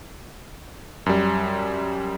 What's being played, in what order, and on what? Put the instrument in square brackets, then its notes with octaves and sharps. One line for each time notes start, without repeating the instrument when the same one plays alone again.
[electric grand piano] F#2 G3